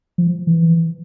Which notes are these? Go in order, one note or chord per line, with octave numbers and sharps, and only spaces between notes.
F3
E3